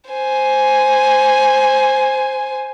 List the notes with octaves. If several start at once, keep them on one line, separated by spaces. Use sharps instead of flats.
C5 G#5